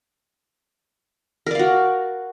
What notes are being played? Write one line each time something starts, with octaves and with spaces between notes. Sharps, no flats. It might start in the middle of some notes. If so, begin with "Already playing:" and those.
F#4 A#4 D5 F5